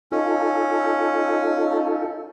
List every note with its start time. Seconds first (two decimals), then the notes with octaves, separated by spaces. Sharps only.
0.12 C#4 D#4 F4 A4